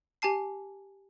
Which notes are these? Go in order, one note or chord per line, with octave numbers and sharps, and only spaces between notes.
G4 G#5 A5 C7